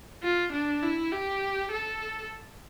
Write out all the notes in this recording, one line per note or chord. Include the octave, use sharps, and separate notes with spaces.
F4
D4
E4
G4
A4